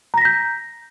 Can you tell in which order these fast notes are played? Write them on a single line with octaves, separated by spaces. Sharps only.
A#5 A#6 B6 G6